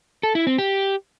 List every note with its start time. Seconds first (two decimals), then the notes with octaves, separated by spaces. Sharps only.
0.23 A4
0.35 E4
0.47 C4
0.58 G4